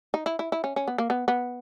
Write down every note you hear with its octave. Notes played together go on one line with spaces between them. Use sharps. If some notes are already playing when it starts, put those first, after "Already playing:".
D#4
E4
E4
E4
C#4
C#4
B3
A#3
B3
B3